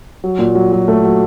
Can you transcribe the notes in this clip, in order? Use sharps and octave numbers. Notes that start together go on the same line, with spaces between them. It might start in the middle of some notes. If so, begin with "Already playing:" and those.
F#3
A#2
F#3
F#3
A3
F#3